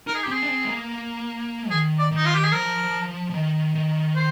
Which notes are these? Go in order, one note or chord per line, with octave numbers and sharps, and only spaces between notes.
D#4 A#4
G#4
G4
C4 G#4
D4
C4
G#3
A#3
D#3 G#4
D5
D#3 D#4
F4
G4
G#4
F3 A#4
F3
D#3
D#3
C5